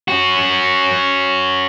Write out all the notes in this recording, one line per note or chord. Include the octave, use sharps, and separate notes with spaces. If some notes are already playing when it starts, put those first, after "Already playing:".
C#4 F#4